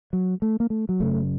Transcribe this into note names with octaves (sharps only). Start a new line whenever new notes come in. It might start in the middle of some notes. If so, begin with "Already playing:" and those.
F#3
A3
A#3
A3
F#3
F#1 F#2 C#3 A3